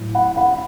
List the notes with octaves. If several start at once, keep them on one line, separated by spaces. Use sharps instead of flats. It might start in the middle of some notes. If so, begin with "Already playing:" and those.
Already playing: A2 F#3
F#5 B5
F#5 B5